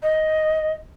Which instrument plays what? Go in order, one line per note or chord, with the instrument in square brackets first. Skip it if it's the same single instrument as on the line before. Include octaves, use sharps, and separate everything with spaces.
[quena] D#5